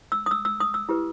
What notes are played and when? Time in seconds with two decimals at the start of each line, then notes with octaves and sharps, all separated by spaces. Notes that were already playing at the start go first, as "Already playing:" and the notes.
0.12 E6
0.26 D#6
0.31 E6
0.45 E6
0.60 D#6
0.74 E6
0.89 E4 G4 B4